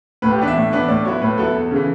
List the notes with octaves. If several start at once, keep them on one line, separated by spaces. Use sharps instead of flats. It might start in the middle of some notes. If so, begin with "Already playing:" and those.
A2 B4
G4
E3 B3 D4
E5
A2
E3 B3 D4
A2 D5
F#3 B3 E4 C#5
A2 B4
F#3 B3 E4 A4
E2
C#3 E3